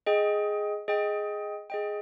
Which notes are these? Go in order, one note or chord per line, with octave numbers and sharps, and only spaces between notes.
G#4 D#5 G5
G#4 D#5 G5
G#4 D#5 G5